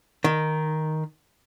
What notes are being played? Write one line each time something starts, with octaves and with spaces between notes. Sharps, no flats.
D#3